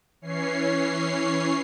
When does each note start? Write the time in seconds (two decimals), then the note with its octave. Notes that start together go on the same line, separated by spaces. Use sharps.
0.22 E3 C#4 C#5 C7